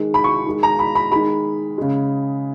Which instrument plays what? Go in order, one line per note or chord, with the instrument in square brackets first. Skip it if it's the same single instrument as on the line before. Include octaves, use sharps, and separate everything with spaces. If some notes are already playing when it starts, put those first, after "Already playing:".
Already playing: [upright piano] D#3 G#3
B5
C#6
D#3 G#3
A#5
B5
B5
D#3 G#3 B5
C#3 G#3